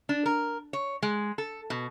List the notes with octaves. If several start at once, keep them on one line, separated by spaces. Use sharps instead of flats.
D4
A#4
C#5
G#3
A4
B2